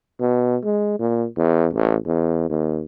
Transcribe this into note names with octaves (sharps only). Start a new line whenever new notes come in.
B2
G#3
A#2
E2
A1
E2
D#2